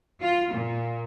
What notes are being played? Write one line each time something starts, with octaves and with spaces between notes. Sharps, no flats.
F4
A#2